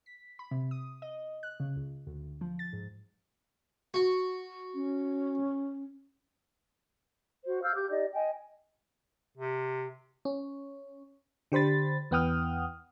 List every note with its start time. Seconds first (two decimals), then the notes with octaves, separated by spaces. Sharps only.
0.06 B6
0.39 B5
0.51 C3
0.71 D#6
1.02 D#5
1.43 F#6
1.60 C#3
1.76 C#2
2.07 D2
2.41 F3
2.59 A6
2.73 G#2
3.94 F#4
4.74 C#4
7.46 F#4 C5
7.62 F5 E6 F6 G6
7.74 G4 D6 G6
7.90 D#4 G4 D5 D#5
8.14 D#5 G5 G#5
9.38 C3
10.25 C#4
11.52 D3 G4 C5 B5 A6
12.11 E2 B3 F#5 G5 D#6 F6